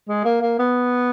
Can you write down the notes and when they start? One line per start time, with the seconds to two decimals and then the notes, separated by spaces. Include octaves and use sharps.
0.09 G#3
0.25 A#3
0.41 A#3
0.59 B3